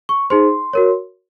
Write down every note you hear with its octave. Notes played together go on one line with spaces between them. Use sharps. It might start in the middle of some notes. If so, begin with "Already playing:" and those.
C#6
D#4 G#4 C5 C6
F#4 A#4 C#5